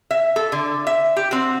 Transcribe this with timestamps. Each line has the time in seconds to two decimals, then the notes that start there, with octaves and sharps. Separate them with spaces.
0.11 E5
0.36 A4
0.52 D3
0.87 E5
1.16 G4
1.31 C4 F#4